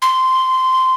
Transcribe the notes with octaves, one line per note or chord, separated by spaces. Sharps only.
C6